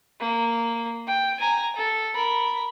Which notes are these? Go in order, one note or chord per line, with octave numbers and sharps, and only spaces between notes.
A#3
G5
G#5 A#5
A4
A#4 B5